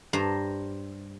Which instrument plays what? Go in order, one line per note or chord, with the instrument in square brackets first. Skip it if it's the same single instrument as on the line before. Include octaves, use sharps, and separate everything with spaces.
[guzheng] G2 C5 A#5